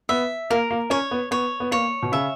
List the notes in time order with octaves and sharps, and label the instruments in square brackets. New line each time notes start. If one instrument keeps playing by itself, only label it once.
[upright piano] B3 [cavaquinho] E5
[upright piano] A#3 [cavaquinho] A#4
[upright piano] A#3
[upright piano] C#4 [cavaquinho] C#5
[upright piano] B3
[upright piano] B3 [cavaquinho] C#5
[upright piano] B3
[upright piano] A#3 [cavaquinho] C#5
[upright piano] B2
[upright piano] C#3 [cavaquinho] E5